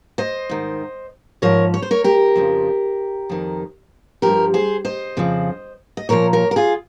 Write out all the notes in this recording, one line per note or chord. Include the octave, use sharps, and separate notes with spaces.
C5 D#5
G#2 D#3
G#2 F3 A#4 C#5
C#5
C5
A#4 C#5
G4 A#4
F2 C#3 F3
F2 D#3
G2 F3 G4 A#4
G#4 C5
C5 D#5
F2 C#3 F3
D#5
A#2 F3 A#4 C#5
A#4 C#5
A#4
F4 G#4